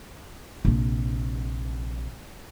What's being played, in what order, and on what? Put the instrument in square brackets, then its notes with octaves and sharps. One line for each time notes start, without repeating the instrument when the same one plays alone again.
[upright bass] A#1 C3